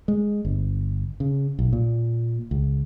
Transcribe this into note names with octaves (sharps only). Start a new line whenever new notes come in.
G#3
G1
C#3
B1
A#2
C#2